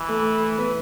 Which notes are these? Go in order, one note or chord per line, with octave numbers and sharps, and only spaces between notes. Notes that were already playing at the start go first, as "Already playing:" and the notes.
Already playing: E3
A3 A4
B3 B4